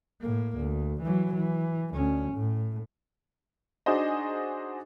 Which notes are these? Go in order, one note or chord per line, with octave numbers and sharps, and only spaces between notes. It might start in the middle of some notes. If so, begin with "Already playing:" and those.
A2 A#3
D2
E3 F#3
E3
D2 C#4
A2
D4 D#4 F#4 G#4 C5 D#5